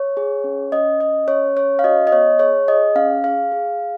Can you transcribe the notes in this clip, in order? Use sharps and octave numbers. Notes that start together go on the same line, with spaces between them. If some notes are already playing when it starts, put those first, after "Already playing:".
Already playing: C#5
G#4
C#4
C#4 D#5
C#4 D#5
C#4 C#5
C#4 C#5
F5
F#4 D#5
D#5
B3 C#5
G#4 C#5
G#4 D#5
C#4 F5
G#4 F5
G#4
G#4